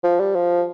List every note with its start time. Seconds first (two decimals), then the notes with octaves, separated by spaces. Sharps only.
0.03 F3
0.20 G3
0.35 F3